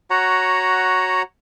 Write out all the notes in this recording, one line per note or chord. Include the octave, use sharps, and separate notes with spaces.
F#4 C#5 F#5 A#5